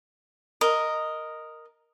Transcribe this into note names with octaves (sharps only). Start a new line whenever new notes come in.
A#4 D#5